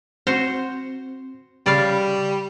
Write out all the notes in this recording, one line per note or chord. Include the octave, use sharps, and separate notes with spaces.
C4 F#4 C5
C#3 G3 D5 F5 B5 C#6